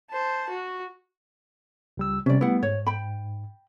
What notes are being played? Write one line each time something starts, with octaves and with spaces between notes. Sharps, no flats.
C5 A5
F#4
C#2 G3 E6
C3 G3 C#4 D5
G3 A3 B3 E4 F#5
G#2 C#5
G5 B5